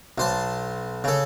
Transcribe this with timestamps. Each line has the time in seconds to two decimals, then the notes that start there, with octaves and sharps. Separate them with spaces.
0.18 B1 C5 A5
1.04 C#3 A4